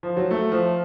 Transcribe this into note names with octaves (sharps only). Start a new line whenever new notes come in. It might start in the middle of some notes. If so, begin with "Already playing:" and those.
F3
F#3
A3
F3